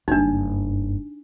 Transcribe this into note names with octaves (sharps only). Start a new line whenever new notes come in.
F#1 G2 D4 D#4